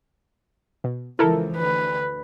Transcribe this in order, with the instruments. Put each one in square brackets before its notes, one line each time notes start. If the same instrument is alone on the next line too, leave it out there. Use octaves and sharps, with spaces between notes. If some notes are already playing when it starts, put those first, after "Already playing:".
[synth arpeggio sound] B2
[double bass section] C#2 E3 F3 [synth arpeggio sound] E4 A4 A#4
[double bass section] D2 [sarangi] B4